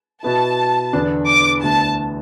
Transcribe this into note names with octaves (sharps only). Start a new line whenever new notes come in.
B2 B3 E4 A5
E2 D3 B3 D4
D6
D2 D3 B3 E4 A5